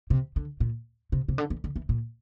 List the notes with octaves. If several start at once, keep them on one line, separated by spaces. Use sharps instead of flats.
C3
D3
A#2
C3
C3
D3
E3
D3
E3
A#2